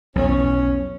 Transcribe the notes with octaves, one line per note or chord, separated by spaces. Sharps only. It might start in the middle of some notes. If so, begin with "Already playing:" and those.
B1 E2 C#4